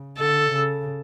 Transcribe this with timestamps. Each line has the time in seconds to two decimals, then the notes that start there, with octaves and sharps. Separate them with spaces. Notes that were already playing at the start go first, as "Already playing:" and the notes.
Already playing: C#3
0.18 D3 A4
0.51 C#3